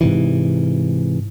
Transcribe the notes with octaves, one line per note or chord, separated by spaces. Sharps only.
G#2 C3 E3